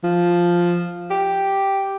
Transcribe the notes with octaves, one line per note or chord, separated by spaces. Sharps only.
F3
G4